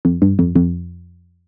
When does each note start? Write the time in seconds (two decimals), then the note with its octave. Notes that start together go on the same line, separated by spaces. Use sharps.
0.05 F2
0.22 G2
0.39 F2
0.55 F2